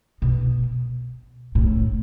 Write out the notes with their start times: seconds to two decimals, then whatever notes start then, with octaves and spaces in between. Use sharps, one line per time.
0.22 B2
1.55 A2